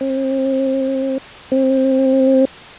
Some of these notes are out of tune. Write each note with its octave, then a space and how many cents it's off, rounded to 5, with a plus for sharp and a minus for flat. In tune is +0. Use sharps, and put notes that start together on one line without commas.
C4 +35
C4 +20